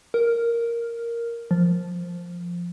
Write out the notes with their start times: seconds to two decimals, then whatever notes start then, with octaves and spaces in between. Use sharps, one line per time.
0.14 A#4
1.51 F3